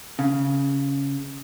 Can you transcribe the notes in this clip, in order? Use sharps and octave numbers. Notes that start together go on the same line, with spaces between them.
C#3